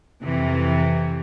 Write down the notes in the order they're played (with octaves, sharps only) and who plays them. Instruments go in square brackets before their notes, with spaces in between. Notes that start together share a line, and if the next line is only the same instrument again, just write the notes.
[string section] F2 C3 E3